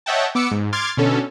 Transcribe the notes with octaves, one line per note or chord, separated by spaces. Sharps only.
C#5 D#5 E5 F#5 G5 A5
B3 D6 E6 C#7
G#2
C6 D6 F6 G#6 A6
B2 D3 C#4 A4